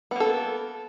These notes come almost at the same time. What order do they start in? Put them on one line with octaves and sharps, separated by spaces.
B3 A#3 A4